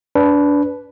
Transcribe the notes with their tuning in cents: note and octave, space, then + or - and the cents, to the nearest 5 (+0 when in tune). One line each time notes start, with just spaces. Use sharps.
D4 -25 B4 +0